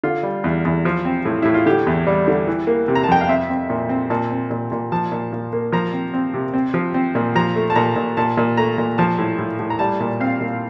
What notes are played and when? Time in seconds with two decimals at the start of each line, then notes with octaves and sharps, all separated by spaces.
0.03 D3 F4
0.23 G3
0.44 E2
0.65 E2
0.85 F3
1.05 C4
1.25 A2
1.42 A2 E4
1.54 F4
1.66 D3 G4
1.87 E2
2.07 G3
2.28 D3
2.47 E3
2.67 A#3
2.88 C3
2.95 A#5
3.04 A5
3.08 F2 G5
3.21 F5
3.28 C4 E5
3.50 C4
3.70 A#2
3.89 C4
4.10 A#2 A5
4.31 C4
4.51 A#2
4.72 A#2
4.92 F3 A5
5.12 A#2
5.32 A#2
5.53 A#3
5.72 F3 A#5
5.93 C4
6.14 C4
6.34 C3
6.53 C4
6.74 F3
6.94 C4
7.15 A#2
7.35 F3 A#5
7.56 A3
7.70 A5
7.75 A#2 A#5
7.96 A#2
8.17 A#2 A5
8.37 A#2
8.57 A3 A#5
8.78 A#2
8.98 F3 A5
9.18 A2
9.39 A2
9.59 A2
9.70 A#5
9.79 G3 A5
10.00 A#2
10.20 C4 F5
10.41 A#2